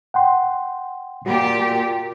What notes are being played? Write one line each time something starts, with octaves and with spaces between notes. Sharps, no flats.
F#5 G5 C6
A#2 F#4 G4